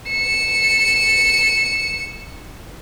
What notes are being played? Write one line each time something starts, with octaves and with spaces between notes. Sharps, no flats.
C#7 E7